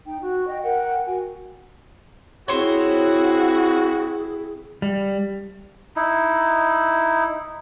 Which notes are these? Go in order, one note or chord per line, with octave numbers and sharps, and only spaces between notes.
D#4 G5
F#4
D#5 G5
A#4 F#5 G5
F#4 G#5
C4 E4 F#4 G#4 C5 C#5
G3
D#4 E4